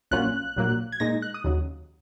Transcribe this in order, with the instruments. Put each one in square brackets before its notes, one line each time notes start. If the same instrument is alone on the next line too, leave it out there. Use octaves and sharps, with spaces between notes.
[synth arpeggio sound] A#1 A#2 F#3 C#4 F4 F#6
A#1 A#2 F#3 A#3
G#6
A#2 G#3 D#4 A#6
F#6
D#6
D#2 C#3 F#3